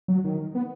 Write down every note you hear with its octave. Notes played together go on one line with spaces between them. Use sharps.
F#3
D#3
B3